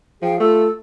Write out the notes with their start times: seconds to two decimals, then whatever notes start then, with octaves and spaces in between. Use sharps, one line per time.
0.22 F3 G#4 F5 G5
0.40 A3 F4 A4 E6